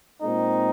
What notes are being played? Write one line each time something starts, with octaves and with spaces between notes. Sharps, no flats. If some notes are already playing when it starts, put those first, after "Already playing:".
A#2 G#3 C4 D#4